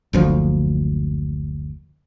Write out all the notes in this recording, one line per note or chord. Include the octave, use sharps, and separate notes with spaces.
F#1 D2 F3